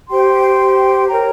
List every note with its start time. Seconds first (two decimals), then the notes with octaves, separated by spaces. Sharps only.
0.10 G4 C5 G5 C6
1.08 A#4 C#5 G5 A#5